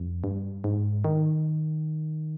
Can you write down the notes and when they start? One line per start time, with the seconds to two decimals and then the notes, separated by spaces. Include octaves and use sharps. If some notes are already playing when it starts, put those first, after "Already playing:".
Already playing: F2
0.24 G2
0.64 G#2
1.04 D#3